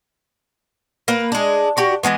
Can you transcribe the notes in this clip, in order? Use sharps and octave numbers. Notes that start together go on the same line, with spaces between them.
A#3 B4
G#3 D4
D4 F#4 G4
E3 F3 G#3 B3